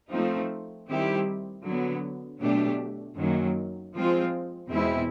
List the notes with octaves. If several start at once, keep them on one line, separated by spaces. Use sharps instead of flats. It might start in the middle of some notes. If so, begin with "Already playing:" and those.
F3 A3 C4 D#4
D#3 G3 C4 E4 G4
D3 F#3 B3
B2 F#3 A3 D4 G4
F#2 D#3 F#3 A#3
F3 G#3 C4 F4
E2 B2 G#3 C4 E4